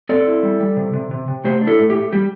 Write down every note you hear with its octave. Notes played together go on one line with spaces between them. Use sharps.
C4 A4 D5
E4
G3
G3
C3
C3
C3
C3
A3 G4 C5
D4
E4 A4
A2
G4
A3
G3 G4